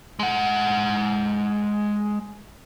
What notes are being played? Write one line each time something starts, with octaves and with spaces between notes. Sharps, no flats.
G#3 F#5